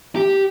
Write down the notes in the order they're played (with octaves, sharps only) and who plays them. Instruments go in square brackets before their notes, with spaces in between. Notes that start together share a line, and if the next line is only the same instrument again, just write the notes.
[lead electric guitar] G4